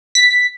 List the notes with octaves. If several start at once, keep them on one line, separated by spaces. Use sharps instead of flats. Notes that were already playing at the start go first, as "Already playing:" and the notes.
B6